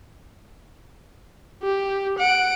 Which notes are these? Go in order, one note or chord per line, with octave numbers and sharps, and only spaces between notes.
G4
F#5 D7